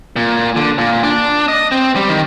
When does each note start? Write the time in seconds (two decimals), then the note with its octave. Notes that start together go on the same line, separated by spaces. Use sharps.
0.16 A#2
0.56 D3
0.78 A#2
1.04 D4
1.48 D#5
1.72 C4
1.95 G3
2.09 D#3